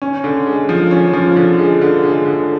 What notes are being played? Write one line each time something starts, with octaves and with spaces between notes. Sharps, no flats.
C#4
D3
G#3
F3
C#4
F3
D3
G#3
D3
G#3
D3